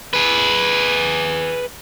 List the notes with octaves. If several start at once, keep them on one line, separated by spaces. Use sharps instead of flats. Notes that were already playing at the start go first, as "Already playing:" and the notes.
G#4 B4